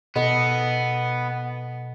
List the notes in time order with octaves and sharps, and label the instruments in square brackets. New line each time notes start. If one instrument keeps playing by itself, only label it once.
[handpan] B2 A4 D#5 [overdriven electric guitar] B3